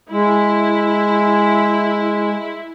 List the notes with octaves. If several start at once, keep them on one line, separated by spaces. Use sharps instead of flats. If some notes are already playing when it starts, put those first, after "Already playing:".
G#3 E4